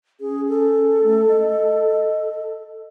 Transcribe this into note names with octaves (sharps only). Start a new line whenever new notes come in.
C#4 G#4
A4
A3
D#5